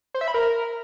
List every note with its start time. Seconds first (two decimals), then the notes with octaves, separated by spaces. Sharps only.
0.14 C5
0.21 E5
0.28 B5
0.34 A#4